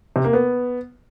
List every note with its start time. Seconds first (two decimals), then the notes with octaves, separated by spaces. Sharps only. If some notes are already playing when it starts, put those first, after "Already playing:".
0.16 C3
0.24 A#3
0.33 B3